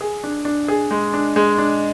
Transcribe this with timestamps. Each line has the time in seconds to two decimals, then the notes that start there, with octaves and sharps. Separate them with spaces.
0.01 G#4
0.24 D4
0.45 D4
0.68 G#4
0.91 G#3
1.14 D4
1.36 G#3
1.58 D4